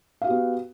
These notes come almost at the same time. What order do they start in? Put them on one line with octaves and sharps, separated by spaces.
F5 F#4 G4 B3